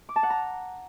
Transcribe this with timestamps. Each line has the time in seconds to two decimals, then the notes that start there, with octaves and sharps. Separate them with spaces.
0.09 D6
0.16 A5
0.23 F#5
0.30 A#5